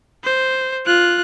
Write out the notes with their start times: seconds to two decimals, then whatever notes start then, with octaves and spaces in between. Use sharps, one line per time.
0.24 C5
0.86 F4 F#6